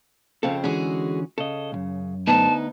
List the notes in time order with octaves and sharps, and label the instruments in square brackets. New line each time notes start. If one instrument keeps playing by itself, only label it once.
[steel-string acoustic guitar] F2 C#3 C4 [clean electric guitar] A4 F5
[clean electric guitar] D3 E3 C#4 [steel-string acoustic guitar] G#3 F#4 G#4
[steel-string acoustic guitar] C#3 [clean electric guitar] A4 D#5
[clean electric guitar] C2 F#2
[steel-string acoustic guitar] D2 B3 D#4 [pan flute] A5